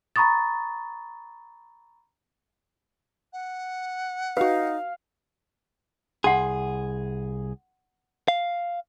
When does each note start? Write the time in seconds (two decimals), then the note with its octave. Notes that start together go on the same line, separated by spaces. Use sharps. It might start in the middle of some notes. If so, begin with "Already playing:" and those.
0.16 A#5 B5 C#6 D#6 A6
3.33 F#5
4.37 D#4 F#4 B4 F5
6.24 C2 G#4 F#5 C6
8.28 F5